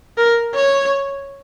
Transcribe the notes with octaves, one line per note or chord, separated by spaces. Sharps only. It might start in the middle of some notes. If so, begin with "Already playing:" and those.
A#4
C#5